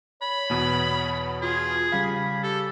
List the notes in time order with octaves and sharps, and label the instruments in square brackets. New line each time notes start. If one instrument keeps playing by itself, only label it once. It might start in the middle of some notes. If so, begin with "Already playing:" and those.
[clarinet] C#5 [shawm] B5
[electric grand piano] E2 B2 B3
[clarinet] F4 [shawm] G#4
[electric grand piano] C#3 G3 F5 [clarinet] B5
[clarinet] G4 [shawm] A4